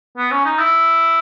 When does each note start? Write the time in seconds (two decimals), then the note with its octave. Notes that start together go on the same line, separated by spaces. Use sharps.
0.17 B3
0.31 C#4
0.45 D#4
0.59 E4